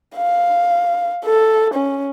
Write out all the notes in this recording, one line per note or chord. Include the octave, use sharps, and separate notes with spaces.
F5
A4
C#4